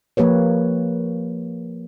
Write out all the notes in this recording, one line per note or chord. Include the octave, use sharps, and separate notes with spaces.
F3 A#3 G4 B4 C#5